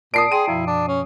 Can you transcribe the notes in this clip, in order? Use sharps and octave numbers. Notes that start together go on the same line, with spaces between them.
A#2 D5 A5 D#6 C7 D7
G#4 G5 C6 D#7
F#2 B2 F3 E4
D4
C#4